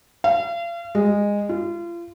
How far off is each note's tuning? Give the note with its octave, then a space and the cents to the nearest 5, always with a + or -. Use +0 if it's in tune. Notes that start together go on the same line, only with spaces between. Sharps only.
F5 -40
G#3 -20
F4 -35